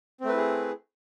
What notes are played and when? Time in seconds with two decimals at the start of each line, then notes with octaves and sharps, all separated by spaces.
0.20 C4
0.25 A3
0.29 B4
0.33 E4
0.37 G#4